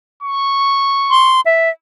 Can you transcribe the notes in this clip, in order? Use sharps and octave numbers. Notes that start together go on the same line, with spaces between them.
C#6
C6
E5